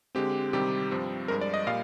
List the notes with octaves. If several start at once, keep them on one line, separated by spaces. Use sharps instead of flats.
D3 G#3 C4 G4
C3 D#3 G3 C4 G4
G2 F3 C4
G2 F3 G#3 A#4
D5
D#5
A#2 G3 F5